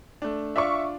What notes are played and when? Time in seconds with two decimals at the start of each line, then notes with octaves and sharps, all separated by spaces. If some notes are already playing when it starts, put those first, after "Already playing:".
0.22 A3 D4
0.56 D4 F4 D5 E5 C#6